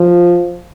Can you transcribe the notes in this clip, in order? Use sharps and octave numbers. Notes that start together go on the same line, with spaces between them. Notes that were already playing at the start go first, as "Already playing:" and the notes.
Already playing: F3